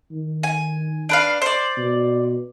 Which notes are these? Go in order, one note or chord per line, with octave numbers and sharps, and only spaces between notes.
D#3
G#5
D4 B4 F5
C5 D5
B2